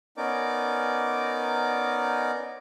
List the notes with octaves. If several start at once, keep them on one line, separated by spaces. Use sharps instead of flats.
B3 C#4 D#4 A#4 D5 D6